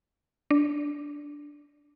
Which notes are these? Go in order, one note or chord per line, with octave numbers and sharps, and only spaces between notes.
D4